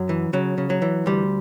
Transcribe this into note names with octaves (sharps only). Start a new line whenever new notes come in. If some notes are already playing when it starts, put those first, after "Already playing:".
Already playing: F#2 F#3
E3
C#3 F#3
C#3
F#3
E3
D2 G3